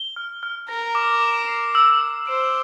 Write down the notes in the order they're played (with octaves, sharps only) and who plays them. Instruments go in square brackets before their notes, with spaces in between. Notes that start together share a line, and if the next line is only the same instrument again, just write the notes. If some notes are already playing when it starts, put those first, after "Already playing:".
Already playing: [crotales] G7
F6
F6
[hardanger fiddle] A#4 [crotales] A#6
[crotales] D6
E7
C7
E6
E6
[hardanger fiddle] C5 [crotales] D7